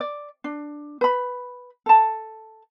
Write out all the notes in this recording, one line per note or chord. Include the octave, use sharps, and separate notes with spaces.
D5
D4
B4 B5
A4 A5